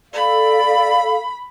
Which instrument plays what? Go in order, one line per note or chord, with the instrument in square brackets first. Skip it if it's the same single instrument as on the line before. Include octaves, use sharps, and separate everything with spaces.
[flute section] A4 F5 [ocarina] D5 [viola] B5